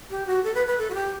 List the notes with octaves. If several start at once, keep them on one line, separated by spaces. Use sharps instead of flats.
G4
F#4
A4
B4
B4
A4
F#4
G4